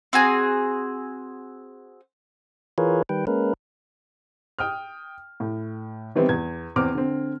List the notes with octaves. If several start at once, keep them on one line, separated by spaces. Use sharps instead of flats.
C4 F#4 G#4
E3 F4 G#4 A#4 B4 C#5
D#3 G3 B4 G5
G#3 A#3 C#4 A#4 B4
G5 D#6 F6
A2
D#3 E3 G3 B3 C4 E4
E2 G#6
E2 C4 D6 F6
D3 C4